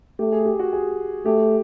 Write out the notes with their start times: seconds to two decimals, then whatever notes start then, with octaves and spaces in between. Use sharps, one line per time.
0.19 A3 G4
0.32 G#4
0.46 G4
0.59 F#4
0.73 G#4
1.26 A3 G4